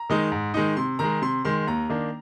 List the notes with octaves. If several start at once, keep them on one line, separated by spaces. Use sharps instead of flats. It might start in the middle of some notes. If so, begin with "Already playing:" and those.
Already playing: A#5
D#3 G#3 D#4
G#2
D#3 G#3 D#4
C3 C6
D#3 G#3 A#5
C3 C6
D#3 G#3 C6
D#2 A#5
D#3 A#3 D4